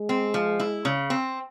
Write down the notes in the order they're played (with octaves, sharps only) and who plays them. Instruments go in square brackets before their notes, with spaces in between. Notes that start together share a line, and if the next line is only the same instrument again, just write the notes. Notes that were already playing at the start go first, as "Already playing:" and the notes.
Already playing: [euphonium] G#3
[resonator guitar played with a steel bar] C4
F3
E4
C#3
C4